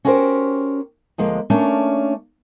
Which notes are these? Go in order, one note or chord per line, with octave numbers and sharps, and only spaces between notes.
C#4 F#4 G4 A#4 C5
D2 F3 G#3 A#3
A3 A#3 C#4 D4